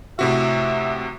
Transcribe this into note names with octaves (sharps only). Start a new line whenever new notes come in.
A2 C3 F#4 E5